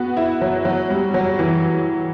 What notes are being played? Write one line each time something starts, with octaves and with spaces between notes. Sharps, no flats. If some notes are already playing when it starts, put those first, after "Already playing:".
Already playing: B3 F#4
E4
F#3
F#3
G3
F#3
E3